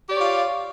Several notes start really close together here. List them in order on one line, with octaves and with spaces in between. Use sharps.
G4 D5 C#5 F4 F5